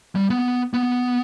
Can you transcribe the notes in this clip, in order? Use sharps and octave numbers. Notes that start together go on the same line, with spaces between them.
G3
B3
B3